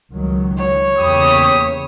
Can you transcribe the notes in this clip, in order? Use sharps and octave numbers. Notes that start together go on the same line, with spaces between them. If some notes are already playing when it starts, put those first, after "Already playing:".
C#2 D#3 F#3
C#5
E2 C#3 A#3 G4 B5 D#6